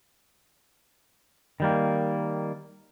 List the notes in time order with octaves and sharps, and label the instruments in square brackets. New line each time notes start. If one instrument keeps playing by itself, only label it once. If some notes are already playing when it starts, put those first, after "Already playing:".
[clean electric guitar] D#3 G3 A#3